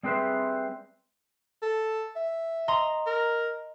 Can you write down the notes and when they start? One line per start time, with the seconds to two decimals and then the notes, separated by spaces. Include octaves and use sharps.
0.03 G3 C4 G#4 B4 C5 E5
1.62 A4
2.16 E5
2.68 D#5 A#5 C6
3.07 A#4